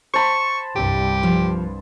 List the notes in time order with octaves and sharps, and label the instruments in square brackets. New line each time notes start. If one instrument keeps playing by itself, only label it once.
[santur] C5 A5 B5 [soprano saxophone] C#6
[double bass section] C2 G2 [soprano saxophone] G4
[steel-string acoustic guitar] F3